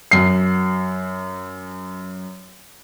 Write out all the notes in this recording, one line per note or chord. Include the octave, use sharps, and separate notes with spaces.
F#2 C7